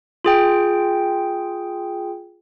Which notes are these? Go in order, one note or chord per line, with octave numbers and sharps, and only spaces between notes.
F4 G#4 G5